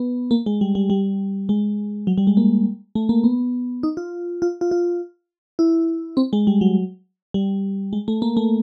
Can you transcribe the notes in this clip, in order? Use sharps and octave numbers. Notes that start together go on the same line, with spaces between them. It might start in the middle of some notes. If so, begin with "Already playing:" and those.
Already playing: B3
A#3
G#3
G3
G3
G3
G#3
F#3
G3
G#3
A#3
A3
A#3
B3
D#4
F4
F4
F4
F4
E4
C4
G#3
G3
F#3
G3
G#3
A3
A#3
A3